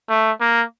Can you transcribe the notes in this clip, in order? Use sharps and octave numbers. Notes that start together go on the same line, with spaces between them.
A3
A#3